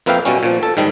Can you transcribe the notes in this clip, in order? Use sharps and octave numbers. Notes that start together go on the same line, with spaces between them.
F2 A#3 B4 E5 F5 G5
B2 G3 C#4
A#2 F3
A4
G#2 D#3 G3